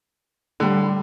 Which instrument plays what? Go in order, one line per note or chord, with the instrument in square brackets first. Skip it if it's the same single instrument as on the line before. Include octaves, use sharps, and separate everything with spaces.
[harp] A2 G3 [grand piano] D3